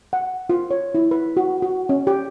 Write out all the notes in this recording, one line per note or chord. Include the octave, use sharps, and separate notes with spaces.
F#5
F4
C#5
E4
B4
F#4
F#4
C#4
G4